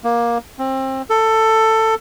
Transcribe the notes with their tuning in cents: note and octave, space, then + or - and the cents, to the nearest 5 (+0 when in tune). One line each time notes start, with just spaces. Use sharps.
A#3 +15
C4 +25
A4 +15